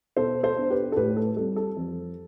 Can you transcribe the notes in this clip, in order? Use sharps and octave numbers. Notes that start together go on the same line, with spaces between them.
B2 A4 C5
A4 C5
B3 D4
G4 B4
A4
A2 G4 B4
A4
G3 C4 A4
A4
F2